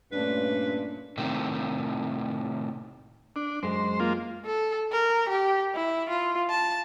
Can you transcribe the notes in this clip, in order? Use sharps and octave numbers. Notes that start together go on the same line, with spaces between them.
G2 A#2 A3 C#4 D4 B4
A2 C3 D#3
D4
F#2 G#3 C5
A#3 F4
A4
A#4
G4
E4
F4
A5